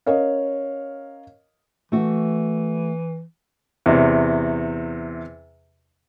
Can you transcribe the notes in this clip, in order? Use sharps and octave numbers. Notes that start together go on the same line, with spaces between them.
C#4 A#4 C#5 D#5 F5
E3 A3 F#4
E2 C3